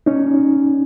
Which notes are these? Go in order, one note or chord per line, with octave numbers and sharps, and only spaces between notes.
C#4 D#4